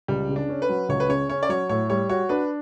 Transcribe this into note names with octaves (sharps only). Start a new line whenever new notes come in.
C#2 G3
C#3
D4
C#4
B4
F#3
C#2 C#5
B4
C#3 C#5
C#4 C#5
D5
F#3 C#5
A2 C#5
G3 C#5
F#4 C#5
D4 B4